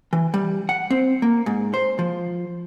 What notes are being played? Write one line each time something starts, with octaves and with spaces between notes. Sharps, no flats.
E3
G3
F#5
C4
A#3
G#2
C5
F3